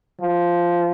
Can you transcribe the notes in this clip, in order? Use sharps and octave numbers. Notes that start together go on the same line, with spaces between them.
F3